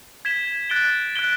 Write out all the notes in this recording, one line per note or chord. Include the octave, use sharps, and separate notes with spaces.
G#6 B6 E7 G7
F#6 A6 D7 G7
F#6 A6 D7 G7